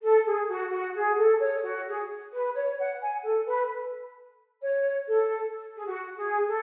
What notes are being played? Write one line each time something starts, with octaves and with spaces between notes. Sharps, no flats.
A4
G#4
F#4
F#4
G#4
A4
C#5
F#4
G#4
B4
C#5
F#5
G#5
A4
B4
C#5
A4
G#4
F#4
G#4
A4